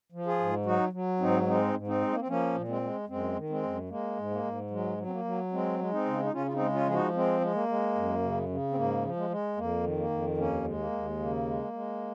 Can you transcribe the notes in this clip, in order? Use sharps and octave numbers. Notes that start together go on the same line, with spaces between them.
F3
F4 G#4
G#2
F#3 D#4 F#4
F#3
G#2 C4 D#4
G#3 C4 D#4
G#2
C4 D#4
G#3
A#3
C4
F3 A#3 C#4
A#2
G#3 C4
G#3
F#2 G#3 C4
D#3
G#3 C4
F#2
G#3 A#3
G#2
A#3
G#2
F#3 G#3
F#3
C4
A#3
F#3
G#3 C4
G#3
C4 D#4
C#3
D#4
C#3 C#4 F4
F4
C4 D#4
G#3
C#4 F4
F3 G#4
D#4 F#4
G#3 C4
G#3
A#3
G#3
F#2
C#3
C#3
C4
G#2 A#3
F3
G#3
G#3
F2 A#3
D#3
A#3
F2
D#2 A#3 C#4
G#3
A#3
D#2
C#3 A#3
G#3
G#3